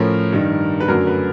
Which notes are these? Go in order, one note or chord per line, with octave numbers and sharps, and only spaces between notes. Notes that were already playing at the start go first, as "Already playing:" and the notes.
Already playing: A2 F3 A3 C#4 A#4
G2 D#3 G3
B4
F#2 D3 F#3 A3 A#4
B4